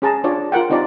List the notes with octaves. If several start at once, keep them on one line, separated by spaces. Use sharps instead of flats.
C#4 G#4 A5 A#5
D4 F4 C#5 D5
F4 A#4 F#5 G5
C4 D#4 F4 G4 D5